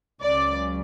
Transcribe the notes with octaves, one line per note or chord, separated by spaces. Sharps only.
C#2 C#3 F#3 D5